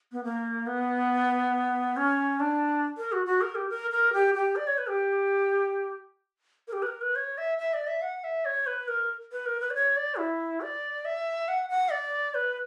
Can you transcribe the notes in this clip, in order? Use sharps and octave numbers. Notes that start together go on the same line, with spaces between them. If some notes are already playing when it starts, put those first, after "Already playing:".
B3
A#3
B3
C#4
D4
A#4
F#4
F#4
A#4
G4
A#4
A#4
G4
G4
D5
C#5
B4
G4
A#4
G4
B4
A#4
B4
C#5
E5
E5
D5
E5
F#5
E5
C#5
B4
A#4
B4
A#4
B4
D5
C#5
D5
E4
D5
E5
F#5
F#5
D5
B4